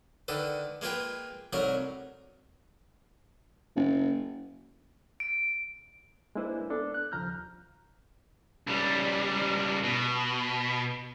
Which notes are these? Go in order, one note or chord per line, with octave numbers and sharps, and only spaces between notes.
D3 D#3 A4 B4
G#3 A#3 F4 B4 G5
C2 F#3 A3 D#4 A#4
F#1
D7
G#3 A#3 D4 E4 B4 C5
B3 D4 A4
F#6
D#2 C#3 F3 A#5 F6 G6
C#2 G3
B2